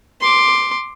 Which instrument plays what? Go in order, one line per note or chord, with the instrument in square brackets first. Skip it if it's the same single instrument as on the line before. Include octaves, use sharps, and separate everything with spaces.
[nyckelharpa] C6 D6